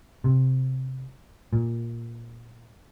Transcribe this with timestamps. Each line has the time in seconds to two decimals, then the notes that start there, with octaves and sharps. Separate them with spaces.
0.24 C3
1.53 A#2